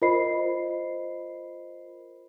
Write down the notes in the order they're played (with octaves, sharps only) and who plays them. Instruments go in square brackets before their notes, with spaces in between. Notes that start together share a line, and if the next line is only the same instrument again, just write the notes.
[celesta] F4 A#4 C5 D#5 B5 C7